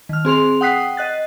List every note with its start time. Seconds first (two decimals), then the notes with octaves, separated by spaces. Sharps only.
0.09 D#3 F6
0.25 C4 G#4 C6 F7
0.61 F#5 G5 D#6 F#6 B6 C7
0.97 D#5 F#6 A6